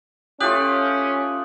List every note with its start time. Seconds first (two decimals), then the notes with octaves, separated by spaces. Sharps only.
0.41 A3 C#4 F4 G4 D#6 F#6 F#7